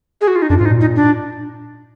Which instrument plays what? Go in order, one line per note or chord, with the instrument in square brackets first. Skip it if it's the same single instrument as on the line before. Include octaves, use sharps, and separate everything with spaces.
[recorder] G#4
F#4
F4
D#4
[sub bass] F#2 [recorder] D4
[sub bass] G#2 [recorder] F4
[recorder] D#4
[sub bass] A#2
[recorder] D#4
D4